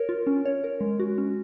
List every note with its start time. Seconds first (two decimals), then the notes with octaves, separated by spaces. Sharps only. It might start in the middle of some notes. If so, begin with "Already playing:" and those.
Already playing: A#4 C#5
0.09 F4
0.27 C#4
0.45 C#5
0.64 A#4
0.81 G#3
1.00 F#4
1.18 C#4